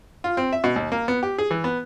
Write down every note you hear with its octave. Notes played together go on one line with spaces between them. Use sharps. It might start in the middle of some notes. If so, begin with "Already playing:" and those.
F4
C4
E5
B2
D#2
A#3
B3
G4
G#4
E3
B3